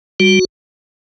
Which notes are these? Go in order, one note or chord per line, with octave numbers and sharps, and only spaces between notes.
G3 F#4